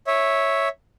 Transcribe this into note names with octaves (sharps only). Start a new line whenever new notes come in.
C#5 E5